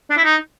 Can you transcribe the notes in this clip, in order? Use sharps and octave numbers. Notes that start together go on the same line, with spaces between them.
D4
E4
D#4